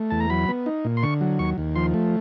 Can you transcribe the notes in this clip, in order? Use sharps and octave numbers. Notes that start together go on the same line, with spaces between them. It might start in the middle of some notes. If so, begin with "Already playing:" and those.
Already playing: A3
E2 A5
A#5
F#3 B5
B3
D#4
A#2
C6
D3 C#6
F#3
D#2 C#6
D#2
F3 C6
A3